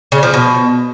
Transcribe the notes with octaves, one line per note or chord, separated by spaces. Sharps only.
C#3
F3
B2